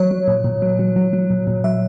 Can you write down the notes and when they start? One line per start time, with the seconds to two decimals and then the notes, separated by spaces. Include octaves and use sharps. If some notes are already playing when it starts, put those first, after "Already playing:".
Already playing: F#3 C#5
0.11 F#3
0.28 A#2
0.44 A#2
0.62 F#3
0.79 F#3
0.96 F#3
1.13 F#3
1.30 A#2
1.47 A#2
1.64 F#3 E5